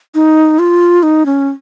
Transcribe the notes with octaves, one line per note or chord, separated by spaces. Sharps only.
D#4
F4
D#4
C#4